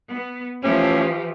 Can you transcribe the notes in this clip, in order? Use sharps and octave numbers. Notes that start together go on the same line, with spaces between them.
B3
E3 F3 A3 C#4 G4